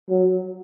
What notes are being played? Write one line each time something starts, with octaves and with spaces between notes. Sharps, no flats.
F#3